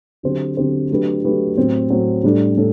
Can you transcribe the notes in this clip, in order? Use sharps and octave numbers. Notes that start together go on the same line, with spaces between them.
D3 F#3 C4 G4 C5
D3 F#3 C4 G4 C5
F#3 A3 D4 G4 B4
F#3 A3 D4 G4 B4
A2 F#3 C4
A2 F#3 C4
A2 G3 D4 A4
A2 A4